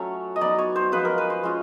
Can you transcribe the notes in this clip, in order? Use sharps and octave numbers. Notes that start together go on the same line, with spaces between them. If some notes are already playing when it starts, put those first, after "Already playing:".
Already playing: F#3 A3 C#4 C#5
D#5
F#3 B3 D#4 D5
C#5
C5
F3 G#3 C#4 F4 B4
A#4
B4
C5
G#3 C#4 F4